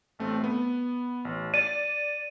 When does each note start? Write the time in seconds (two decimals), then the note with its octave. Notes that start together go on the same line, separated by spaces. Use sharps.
0.19 A1 A3 C4
0.44 B3
1.25 A1
1.54 D5 A6 D#7